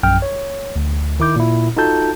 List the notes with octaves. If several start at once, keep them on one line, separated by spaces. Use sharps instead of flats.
A#1 F#2 G5 F6
C#5
D2
D#3 E4 D6 G6
A#2 E4
D#4 F4 F#4 A4 A5 G6